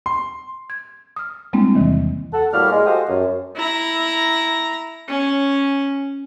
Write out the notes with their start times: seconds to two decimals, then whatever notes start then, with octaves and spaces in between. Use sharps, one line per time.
0.06 C6
0.70 G#6
1.16 D#6 F6
1.53 G3 G#3 A#3 C4 D4 E4
1.75 E2 C3 D#3 E3
2.33 A4 F#5
2.53 A2 G3 A#3 F#4 D5 F6
2.71 G#3
2.86 F#4 G4 A4 C5 D#5 F5
3.09 F#2
3.56 E4 A#5
5.08 C#4